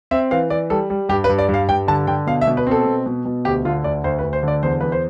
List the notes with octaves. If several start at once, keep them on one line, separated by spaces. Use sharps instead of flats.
C4 E5
E3 F5
E3 D5
G3 A4
G3
G2 G4
B4
G2
D5
G2
F5
G2 G5
D3 A5
D3 G5
B2 F5
E5
B2
B4
C4 A4
B2
B2
B2
D2 G4
D3 F4
D2 D5
D2 C5
B4
D2
C5
D3 D5
E2 C5
E2 B4
C5